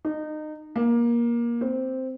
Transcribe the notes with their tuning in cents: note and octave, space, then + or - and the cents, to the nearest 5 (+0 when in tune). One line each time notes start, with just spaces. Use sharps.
D#4 -25
A#3 +20
C4 -5